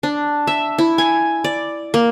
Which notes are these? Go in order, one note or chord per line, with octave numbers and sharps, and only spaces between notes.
D4
E5
E4
G#5
D5
A#3